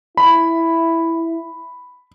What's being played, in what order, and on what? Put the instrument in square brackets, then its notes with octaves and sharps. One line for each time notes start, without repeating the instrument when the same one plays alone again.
[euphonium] E4 [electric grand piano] B5